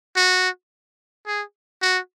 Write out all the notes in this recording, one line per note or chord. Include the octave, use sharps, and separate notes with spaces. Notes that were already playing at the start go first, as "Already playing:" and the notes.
F#4
G#4
F#4